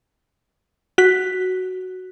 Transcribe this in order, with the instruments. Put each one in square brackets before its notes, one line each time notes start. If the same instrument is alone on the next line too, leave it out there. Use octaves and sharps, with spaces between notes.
[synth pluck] F#4 F#6 B6